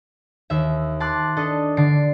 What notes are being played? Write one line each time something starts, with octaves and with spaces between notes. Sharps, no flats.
D#2 E5
A5 C6 D6 F#6
D4 A4 D#5
D3 A5 C7 D7